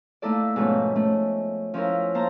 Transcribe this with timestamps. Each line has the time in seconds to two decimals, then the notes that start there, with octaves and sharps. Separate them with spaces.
0.22 A3 A#3 D#4 E4 A4 D5
0.56 G#2 B2 F3 A3 A#3 C#4
0.96 A3 C#4
1.74 F3 C#4 E4 A#4
2.14 A#3 C5 A5 A#5